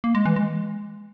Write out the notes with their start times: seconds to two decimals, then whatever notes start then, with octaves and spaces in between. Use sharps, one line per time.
0.04 A#3
0.15 G#3
0.26 E3
0.36 G#3